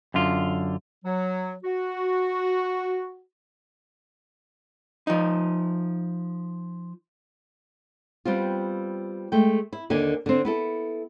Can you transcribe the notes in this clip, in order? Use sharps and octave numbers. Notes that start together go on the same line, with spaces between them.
F#2 D3 F4
F#3
F#4
F3 D#4
G3 B3 C4 F4
G#3 A3 G5
E4
D#2 D3 A#3 D#4 G#5
D3 C4
B3 E4 A4